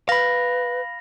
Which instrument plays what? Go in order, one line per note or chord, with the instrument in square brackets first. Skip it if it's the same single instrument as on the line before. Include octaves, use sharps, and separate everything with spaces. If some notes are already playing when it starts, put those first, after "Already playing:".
[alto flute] B4 [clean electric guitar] F5 B5 [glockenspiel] A#6